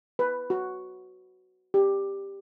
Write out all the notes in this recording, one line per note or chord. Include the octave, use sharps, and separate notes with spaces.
B4
F#4
G4